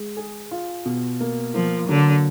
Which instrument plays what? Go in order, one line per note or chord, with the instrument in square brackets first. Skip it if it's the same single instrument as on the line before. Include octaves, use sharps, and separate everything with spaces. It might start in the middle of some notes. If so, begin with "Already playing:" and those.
Already playing: [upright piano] G#3
G#4
F4
B2
A#3
[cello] F3 [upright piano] A#3
[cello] D3 [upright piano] F#3